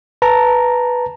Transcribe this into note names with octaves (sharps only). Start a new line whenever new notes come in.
B4 A5 A#5